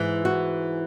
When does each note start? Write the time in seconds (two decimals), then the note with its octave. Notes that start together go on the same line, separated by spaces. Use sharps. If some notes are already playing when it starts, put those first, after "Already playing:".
Already playing: G#2 E3
0.25 F#4